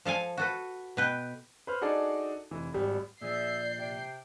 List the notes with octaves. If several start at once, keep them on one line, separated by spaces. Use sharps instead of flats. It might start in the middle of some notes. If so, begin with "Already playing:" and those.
F3 A4 F5 G#5
F#4 A4 B4
B2 B4 G5
B4 C5 F6
D4 D#4 F#4 G#4 A4 D5
F1 E3
G#1 G3
A#2 F3 G#4 D5 E5 G6 C7
C3 G5